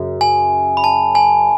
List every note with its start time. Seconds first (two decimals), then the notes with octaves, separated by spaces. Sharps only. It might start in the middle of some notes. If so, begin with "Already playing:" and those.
Already playing: F#2 C#3
0.21 G#5
0.77 B5
0.84 A5
1.15 G#5